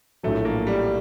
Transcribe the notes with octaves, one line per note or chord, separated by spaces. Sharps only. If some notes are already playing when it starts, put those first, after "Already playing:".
A#1 A2 F#3 A3
A#3
G3